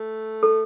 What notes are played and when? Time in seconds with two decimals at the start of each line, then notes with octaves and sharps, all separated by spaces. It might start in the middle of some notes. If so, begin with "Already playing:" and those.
Already playing: A3
0.43 A4